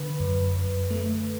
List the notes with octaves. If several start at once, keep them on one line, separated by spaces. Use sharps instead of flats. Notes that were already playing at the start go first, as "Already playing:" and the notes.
Already playing: D3 B4
F#2
F#2
A3